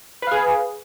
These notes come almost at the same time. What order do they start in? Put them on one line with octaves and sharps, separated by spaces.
B4 F5 G#4